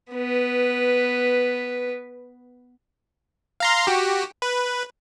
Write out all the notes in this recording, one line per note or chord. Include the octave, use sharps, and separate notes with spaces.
B3 B4
F5 A#5 C6
F#4 G4
B4